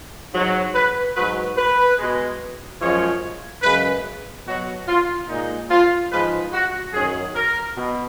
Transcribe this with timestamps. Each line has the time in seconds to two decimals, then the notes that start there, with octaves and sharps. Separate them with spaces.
0.33 G#2 F#3
0.74 B4
1.15 G#2 F#3 B4
1.57 B4
1.98 B2 G#3
2.80 F#2 F3 G#3 C#5
3.63 F#2 C#3 G#3 B4
4.46 B2 F#3 F#4
4.87 F4
5.28 A#2 G#3 D#4
5.69 F4
6.11 G#2 F3 G#3 B4
6.52 F#4
6.93 F#2 D#3 F#3 G#4
7.35 A#4
7.76 B2